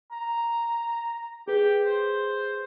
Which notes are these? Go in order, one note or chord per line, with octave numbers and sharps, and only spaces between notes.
A#5
G4 G#4 B4
C5